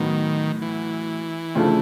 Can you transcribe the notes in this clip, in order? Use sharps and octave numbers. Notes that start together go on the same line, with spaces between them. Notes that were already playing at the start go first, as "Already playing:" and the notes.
Already playing: A2 D#3 F#3 B3
E3
D2 C#3 F3 A3 D4